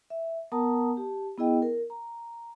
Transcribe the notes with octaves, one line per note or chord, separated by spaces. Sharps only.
E5
B3 A#4 F#5 A5 A#5 D#6
G4 A5
B3 E4 G#4 D#5 G5
A#4
A#5